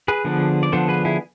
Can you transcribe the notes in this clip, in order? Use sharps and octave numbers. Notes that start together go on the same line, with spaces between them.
G#4 B4
D3 F3 B3 D4
D5
D3 F3 B3 D4 A4 C5
G#4 B4
E4 G#4